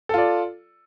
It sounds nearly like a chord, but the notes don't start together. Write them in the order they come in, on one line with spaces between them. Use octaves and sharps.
A4 F4 D5